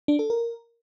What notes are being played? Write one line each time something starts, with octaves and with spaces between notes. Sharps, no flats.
D4
A4
A#4